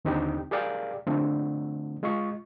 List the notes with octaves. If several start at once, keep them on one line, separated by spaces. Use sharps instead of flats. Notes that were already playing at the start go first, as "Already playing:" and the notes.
D#2 D3 C4 D#4 G4 G5
G4 G#4 A#4 D5 F5 G5
D3 F3 A3 C4
G#3 F4 D#5 C#6